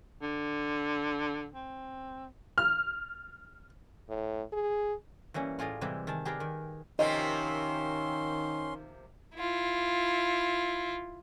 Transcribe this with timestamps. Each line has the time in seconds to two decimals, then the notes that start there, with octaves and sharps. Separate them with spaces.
0.22 D3
1.55 C4
2.58 F6
4.09 A2
4.53 G#4
5.34 E3 G3 A#3 C#4
5.59 A2 F4 G#4 D5 D#5
5.81 C3 E3 G3 G#3 E4 G4
6.07 D#3 G#4 A5
6.25 G4 G#4 A#4 B4 D5 F5
6.40 D#3
6.99 C3 D#3 F3 A#3 C#4 D#5 C6
9.35 E4 F4